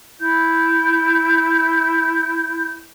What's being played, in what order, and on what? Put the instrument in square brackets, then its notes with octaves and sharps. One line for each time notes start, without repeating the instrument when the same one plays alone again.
[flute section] E4 G6